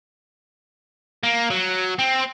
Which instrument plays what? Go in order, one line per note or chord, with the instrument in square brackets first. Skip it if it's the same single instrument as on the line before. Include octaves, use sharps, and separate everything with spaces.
[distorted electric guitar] A#3
F#3
C4